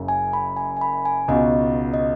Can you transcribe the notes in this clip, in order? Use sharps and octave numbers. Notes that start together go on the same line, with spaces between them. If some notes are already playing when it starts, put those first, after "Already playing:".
Already playing: F#1 F#2 C#3
G#5
B5
G#5
G#5
B5
G#5
C#2 B2 B3 D#4 F#4 D#5
D#5